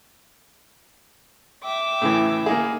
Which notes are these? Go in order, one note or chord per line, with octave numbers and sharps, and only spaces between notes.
E5 G5 D6
A2 C#3 E3
A#3 D#4 G#4